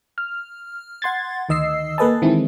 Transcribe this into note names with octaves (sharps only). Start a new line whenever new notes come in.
F6
F#5 C6 G#6 A6
D2 D#3 D#5 E6 C7
A#3 A4 B4 D#5 G#5 A5
D#3 E3 G#3 C4 E4